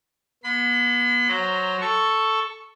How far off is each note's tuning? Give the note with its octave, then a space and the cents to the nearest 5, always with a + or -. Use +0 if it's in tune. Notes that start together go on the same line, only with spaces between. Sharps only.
B3 -40 B5 +40
F#3 +0 C5 +0 A#5 +0
A4 +0 C#6 +0